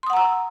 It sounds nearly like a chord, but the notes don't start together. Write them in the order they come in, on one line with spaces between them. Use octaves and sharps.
C6 D#6 F#5 A#5 E6